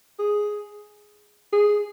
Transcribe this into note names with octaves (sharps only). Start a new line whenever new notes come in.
G#4
G#4